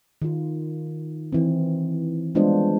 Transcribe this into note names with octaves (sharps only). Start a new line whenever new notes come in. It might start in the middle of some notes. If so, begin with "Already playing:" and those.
D#3 F4
E3 C4
G3 G#3 B3 D4 F4 C5